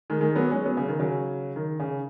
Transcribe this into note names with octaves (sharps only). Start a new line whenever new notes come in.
D#3 G#3
D#3 G#3
F#3 B3
G#3 C#4
F#3 B3
C#3
D#3
C#3 F#3
D#3
C#3